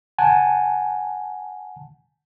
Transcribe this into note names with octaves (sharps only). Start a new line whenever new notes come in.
F#5 G#5 A5